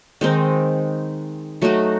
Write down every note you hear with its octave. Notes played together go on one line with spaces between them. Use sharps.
D#3 G#3 C4 D#4
F#3 A3 D#4 F#4